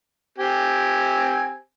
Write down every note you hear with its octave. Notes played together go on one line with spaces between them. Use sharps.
C4 G4 G#5